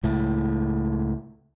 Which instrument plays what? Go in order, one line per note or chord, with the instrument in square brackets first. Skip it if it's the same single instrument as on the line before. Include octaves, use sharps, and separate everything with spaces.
[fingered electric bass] C#2 A2